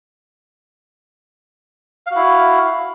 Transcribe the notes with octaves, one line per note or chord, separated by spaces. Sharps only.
E4 F#4 F5